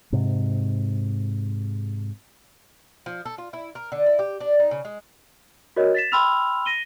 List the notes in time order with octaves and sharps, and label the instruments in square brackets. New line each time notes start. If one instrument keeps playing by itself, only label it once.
[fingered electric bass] G#2 C3
[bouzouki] F3
A4
F4
E4
A#4
D3
E4
G4
D4
D#4
C#3
G#3
[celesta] F#4 A#4 C#5 D#5
A6 B6 E7
G5 B5 C6 E6 F6 F7
A#6 D#7 G7